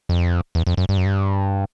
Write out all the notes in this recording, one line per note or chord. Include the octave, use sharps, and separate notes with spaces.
F2
E2
F2
F#2
G2
F#2
G2